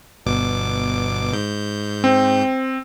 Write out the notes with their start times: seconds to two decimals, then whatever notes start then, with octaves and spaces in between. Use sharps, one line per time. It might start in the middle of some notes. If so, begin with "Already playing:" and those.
0.26 G1 B2 D6
1.33 G#2 G6
2.04 C4